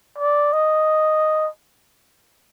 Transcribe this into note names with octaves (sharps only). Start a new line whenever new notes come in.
D5
D#5